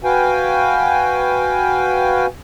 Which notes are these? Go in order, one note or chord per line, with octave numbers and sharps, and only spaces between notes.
F#4 B4 F5 G5 G#5